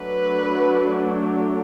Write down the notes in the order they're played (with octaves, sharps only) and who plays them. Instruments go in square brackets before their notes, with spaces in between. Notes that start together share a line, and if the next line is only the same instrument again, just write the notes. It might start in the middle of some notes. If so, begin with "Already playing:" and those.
Already playing: [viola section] F#3 A3 D4 B4